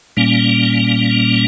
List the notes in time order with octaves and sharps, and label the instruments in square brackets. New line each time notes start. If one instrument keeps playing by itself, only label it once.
[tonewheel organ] A#2 G3 A#3 C#4